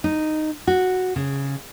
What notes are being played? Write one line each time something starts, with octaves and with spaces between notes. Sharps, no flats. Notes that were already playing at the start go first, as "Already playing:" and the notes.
D#4
F#4
C#3